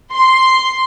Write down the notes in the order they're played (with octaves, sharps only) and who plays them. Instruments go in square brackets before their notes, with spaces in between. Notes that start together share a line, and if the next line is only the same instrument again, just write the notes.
[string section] C6